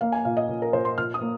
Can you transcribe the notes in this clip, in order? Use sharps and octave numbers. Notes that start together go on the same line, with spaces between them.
A#3 F5
G#5
A#2 F5
D#5
A#2
A#4
A#2 C5
C6
A#2 F6
D#6
A#3